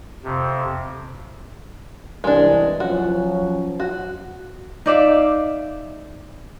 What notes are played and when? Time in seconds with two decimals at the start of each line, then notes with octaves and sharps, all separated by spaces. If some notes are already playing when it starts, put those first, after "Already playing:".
0.24 F2 C3
2.24 C2 E3 G#3 D4
2.80 F3 F#3 C#4 F#4
3.80 F#4
4.86 D#4 D5 E5 F5